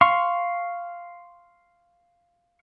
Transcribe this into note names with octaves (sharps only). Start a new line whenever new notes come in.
F5 C6 C#6